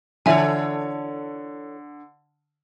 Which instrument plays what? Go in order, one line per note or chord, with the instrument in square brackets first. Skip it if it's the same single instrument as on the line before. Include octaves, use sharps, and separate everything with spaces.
[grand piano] D3 [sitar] E3 A4 C#5 [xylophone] E5 G#5